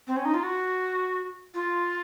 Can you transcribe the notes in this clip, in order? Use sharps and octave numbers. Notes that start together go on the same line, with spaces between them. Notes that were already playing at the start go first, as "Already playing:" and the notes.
C4
C#4
D#4
F4
F#4
F4